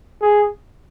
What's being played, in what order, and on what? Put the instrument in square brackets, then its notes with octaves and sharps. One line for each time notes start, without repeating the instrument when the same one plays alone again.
[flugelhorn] G#4